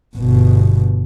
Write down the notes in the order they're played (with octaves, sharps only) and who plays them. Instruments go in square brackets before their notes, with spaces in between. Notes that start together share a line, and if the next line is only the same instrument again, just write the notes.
[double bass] G1 B2